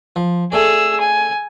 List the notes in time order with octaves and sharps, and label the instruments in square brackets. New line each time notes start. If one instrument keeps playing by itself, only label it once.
[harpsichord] F3
[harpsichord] A3 A4 D5 [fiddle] G#4 E6
[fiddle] G#5